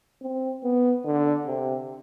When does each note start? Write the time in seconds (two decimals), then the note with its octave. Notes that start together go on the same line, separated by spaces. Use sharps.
0.22 C4
0.64 B3
1.05 D3
1.46 C3